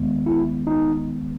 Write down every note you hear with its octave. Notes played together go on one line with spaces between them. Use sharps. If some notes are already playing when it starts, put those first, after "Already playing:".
Already playing: D#2 D#3 G#3 B3
E4
D#4